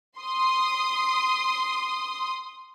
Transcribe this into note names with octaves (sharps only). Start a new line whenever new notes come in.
C6 D#6